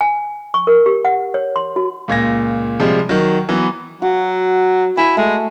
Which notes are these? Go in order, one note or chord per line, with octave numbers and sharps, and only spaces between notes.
G#5
C#6
A#4
G4
F#5
C#5
C6
F#4
C#2 A#2 G#6 A#6
C3 F3 G3 G#3
D#3 F#3
E3 F#3 B3
F#3 F#4
E4 G#5 B5
G#3 A3